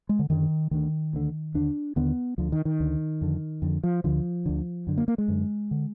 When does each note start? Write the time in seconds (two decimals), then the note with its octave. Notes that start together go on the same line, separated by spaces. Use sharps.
0.09 G#3
0.19 D3
0.30 F#2 D3 D#3
0.71 D2 D3 D#3
1.13 D2 D3
1.54 D#2 D3 D4
1.96 D#2 D3 B3
2.38 D2 D3 F3
2.52 D#3
2.65 D#3
2.80 D2 D3
3.21 F2 D3
3.62 F2 D3
3.84 F3
4.04 D2 D3 F3
4.46 D2 D3
4.87 F#2 D3
4.98 A#3
5.08 A#3
5.18 G#3
5.28 F#2 D3
5.71 D3